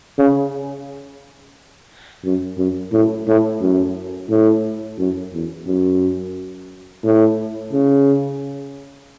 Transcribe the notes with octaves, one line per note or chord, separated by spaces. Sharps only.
C#3
F#2
F#2
A2
A2
F#2
A2
F#2
E2
F#2
A2
C#3